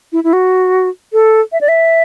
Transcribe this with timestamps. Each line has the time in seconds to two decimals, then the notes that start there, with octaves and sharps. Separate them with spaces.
0.12 E4
0.24 E4
0.33 F#4
1.13 A4
1.52 E5
1.61 D5
1.68 E5